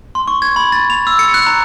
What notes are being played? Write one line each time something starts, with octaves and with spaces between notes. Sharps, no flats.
C6
C#6
G#6
B5
A6
F7
E6
C#7
F#6
A#5